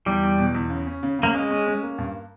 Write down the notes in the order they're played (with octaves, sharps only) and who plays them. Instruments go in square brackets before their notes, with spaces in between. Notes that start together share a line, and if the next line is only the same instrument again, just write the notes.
[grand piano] E2 [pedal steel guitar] G3
[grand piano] E2
B2
E2
C#3
C#4
C#3
[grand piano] C#3 [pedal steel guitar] A#3
[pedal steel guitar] G#3 [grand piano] C#4
[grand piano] C#4
C#4
A#3
G2